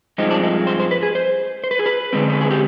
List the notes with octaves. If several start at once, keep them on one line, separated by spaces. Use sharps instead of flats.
G2 F3 G#3 C4 D#4
D4
D#4
C5
C5
B4
G#4
C5
C5
B4
G#4
B4
D3 G#3 C4
B4
G#4
G4